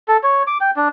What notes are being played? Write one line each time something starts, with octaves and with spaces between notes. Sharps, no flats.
A4
C#5
D6
G5
D4